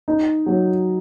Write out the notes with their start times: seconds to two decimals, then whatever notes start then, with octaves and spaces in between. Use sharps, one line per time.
0.08 D#4
0.46 F#3